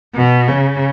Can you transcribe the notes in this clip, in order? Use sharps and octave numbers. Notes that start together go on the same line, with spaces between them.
B2
C#3